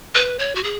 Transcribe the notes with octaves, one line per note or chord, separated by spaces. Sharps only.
B4
C#5
F#4
G#4